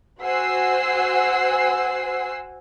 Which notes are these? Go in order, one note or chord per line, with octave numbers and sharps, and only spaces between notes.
F#4 C5 F#5 G#5 E6 C7